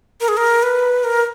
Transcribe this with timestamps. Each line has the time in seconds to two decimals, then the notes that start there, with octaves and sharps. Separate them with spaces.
0.21 A#4
0.28 G#4
0.37 A#4
0.63 B4
1.04 A#4